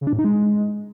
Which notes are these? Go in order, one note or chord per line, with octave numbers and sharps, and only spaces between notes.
C#3
D4
A2
D#4
G#3